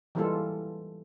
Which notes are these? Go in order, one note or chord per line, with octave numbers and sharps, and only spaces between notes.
E3 G3 G#3 A#3 F4 A4